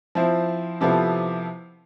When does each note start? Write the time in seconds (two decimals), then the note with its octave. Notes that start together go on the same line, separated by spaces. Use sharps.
0.15 F3 C4 E4
0.81 C3 F3 B3 E4 A4